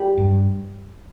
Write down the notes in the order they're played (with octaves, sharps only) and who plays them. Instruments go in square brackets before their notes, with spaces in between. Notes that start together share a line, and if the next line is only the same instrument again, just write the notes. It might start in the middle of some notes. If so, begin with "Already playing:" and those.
Already playing: [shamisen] G3
[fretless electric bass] G2